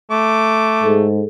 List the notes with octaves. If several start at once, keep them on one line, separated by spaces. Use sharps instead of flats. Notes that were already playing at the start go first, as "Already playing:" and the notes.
A3 D6
G#2 G#4 A4